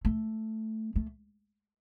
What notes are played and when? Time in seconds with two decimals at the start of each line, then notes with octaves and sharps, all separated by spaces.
0.05 A3
0.96 A3